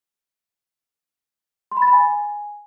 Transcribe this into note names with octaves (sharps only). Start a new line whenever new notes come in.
C6
B5
A6
B5
G#5